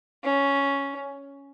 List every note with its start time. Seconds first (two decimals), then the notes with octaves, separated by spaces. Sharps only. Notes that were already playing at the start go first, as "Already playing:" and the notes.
0.24 C#4